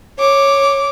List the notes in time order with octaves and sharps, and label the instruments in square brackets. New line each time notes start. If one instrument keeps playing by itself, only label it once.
[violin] C#5 D6